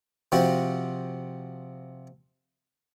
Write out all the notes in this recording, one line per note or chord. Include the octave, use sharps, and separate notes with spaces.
C3 F3 C4 F#4